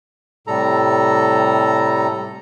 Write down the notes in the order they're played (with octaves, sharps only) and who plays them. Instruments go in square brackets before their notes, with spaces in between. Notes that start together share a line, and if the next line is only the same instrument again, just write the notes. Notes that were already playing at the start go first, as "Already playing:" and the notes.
[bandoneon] A2 C3 G3 A4 A#5